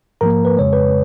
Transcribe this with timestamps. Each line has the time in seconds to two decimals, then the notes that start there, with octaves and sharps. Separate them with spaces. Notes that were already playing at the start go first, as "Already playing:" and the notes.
0.21 G#2 F3 A#3 A#4 A#5
0.45 B4
0.57 F2 C#3 G#3 C#5
0.73 B4